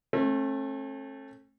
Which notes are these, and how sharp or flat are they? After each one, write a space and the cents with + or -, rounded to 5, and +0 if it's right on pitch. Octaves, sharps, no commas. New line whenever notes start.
A3 +0 C#4 -45